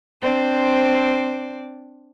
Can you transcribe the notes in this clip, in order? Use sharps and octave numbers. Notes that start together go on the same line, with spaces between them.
C4 D4 C5 D5